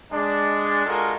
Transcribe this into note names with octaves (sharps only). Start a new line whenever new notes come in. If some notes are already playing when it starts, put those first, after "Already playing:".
G#3 D4
G#3 D4 F4 F#4 A4 A#4